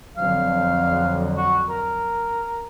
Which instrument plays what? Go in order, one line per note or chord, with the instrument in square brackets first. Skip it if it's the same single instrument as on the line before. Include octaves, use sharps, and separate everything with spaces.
[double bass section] F2 D3 F#3 [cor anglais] F5
[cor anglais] F#4
A#4